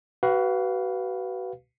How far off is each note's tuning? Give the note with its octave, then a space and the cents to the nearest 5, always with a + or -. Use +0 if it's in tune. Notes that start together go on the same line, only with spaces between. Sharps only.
F#4 +35 B4 +0 F5 +0